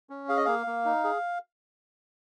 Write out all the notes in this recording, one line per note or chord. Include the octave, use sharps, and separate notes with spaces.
C#4
G#4 F5
D#5
A#3 F5
A#3
D#4
G#4